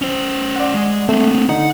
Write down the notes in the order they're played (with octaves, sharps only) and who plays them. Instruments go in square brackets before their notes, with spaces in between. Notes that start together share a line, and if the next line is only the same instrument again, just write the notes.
[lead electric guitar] C#4 C5
[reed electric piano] D5 F#5
[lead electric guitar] G#3
[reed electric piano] A3 [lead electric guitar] A#3 C4
[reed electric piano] D3 D#4 [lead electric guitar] F#5